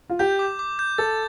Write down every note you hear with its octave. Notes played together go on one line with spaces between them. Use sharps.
F4
G4 G6
D6
D6
G6
A4 A6